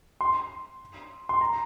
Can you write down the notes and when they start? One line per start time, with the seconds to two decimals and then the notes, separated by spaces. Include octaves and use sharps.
0.21 C6
1.29 C6
1.41 A#5